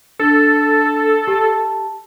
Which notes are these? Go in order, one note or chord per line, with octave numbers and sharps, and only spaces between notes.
D4 A4 A6
G4 A5